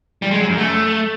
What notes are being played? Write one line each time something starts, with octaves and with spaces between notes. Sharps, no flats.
G3
G#3
F#3
F#2
A3